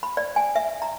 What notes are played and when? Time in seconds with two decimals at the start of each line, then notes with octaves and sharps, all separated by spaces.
0.03 B5
0.17 D5
0.36 G#5
0.56 E5
0.82 A#5